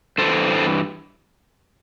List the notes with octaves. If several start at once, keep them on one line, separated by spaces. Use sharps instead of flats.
G2 E3 A4 C5